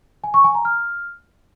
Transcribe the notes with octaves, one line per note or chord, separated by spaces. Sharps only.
G#5
C#6
G#5
A#5
F6